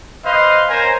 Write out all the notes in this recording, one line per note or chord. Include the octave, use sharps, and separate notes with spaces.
B4 C5 D#5 F5 C6
C#4 A#4 C5 G#5 A#5